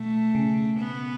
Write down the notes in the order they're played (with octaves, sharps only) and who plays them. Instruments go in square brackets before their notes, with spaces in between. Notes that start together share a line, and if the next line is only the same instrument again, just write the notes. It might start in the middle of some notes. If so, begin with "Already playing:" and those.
Already playing: [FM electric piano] B2 [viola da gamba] A3
[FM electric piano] C#3
[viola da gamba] B3